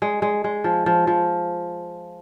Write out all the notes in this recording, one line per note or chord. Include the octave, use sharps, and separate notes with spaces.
G#3
G#3
G#3
F3
F3
F3